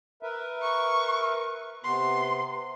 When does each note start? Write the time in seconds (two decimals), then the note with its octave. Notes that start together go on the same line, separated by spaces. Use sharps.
0.23 A#4 B4 E5
0.62 C#6
1.84 C3 B3 C6